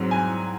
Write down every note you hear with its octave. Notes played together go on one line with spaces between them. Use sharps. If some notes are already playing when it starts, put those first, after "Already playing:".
Already playing: G#2 F#3 C4
G#5